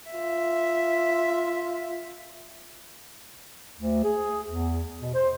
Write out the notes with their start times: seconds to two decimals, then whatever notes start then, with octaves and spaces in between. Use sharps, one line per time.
0.14 F4 E5
3.78 D2
4.03 G#4
4.47 E2
5.02 B2
5.14 C5